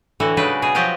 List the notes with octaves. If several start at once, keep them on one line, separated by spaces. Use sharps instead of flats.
A2 D3 E3 F#4
C#3 F#3 G#3 D4 D#4 B4
B2 G#4
F3 F#3 F4 G4 D#5